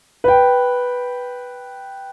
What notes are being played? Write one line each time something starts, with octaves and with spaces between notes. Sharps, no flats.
B4 G5